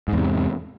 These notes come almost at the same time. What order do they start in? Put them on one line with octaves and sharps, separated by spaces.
G#2 E2 C3